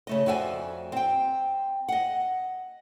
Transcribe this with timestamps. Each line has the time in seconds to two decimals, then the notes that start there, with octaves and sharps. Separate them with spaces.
0.07 C#3 A3 D#5
0.26 F2 F#4 D5 E5 G5 G#5
0.92 C4 G5
1.88 D#5 F#5